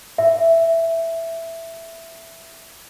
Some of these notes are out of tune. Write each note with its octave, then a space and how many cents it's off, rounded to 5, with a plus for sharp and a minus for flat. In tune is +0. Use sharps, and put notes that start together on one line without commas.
E5 +5